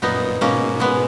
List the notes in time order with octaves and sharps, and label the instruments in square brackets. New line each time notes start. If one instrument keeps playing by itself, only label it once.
[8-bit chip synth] F#2 A#2 [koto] B3 D#4
[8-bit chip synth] G#2 B2 [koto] A#3 C#4
[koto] G#3 B3